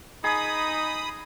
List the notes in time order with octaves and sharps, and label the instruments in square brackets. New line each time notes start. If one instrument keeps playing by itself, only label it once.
[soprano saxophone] D#4 [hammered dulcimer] G#4 [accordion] B5 D#6